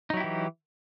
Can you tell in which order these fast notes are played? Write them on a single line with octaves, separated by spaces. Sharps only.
D#4 F#3 E4 G4 E3